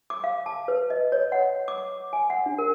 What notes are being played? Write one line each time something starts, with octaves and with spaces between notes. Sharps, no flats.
D6
F5
A5
B4
D#5
C#5
F#5
D6
G#5
F#5
D4
A#4